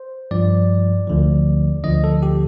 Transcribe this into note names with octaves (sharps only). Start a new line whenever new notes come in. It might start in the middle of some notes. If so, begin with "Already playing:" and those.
Already playing: C5
G2 F3 D5
D2 D3 F3
D2 D3 F3 D#5
A4
G4